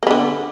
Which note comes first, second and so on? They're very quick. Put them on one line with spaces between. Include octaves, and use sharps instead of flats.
A#3 B3 D3